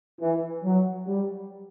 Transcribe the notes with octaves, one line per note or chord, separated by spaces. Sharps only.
E3
F#3
G3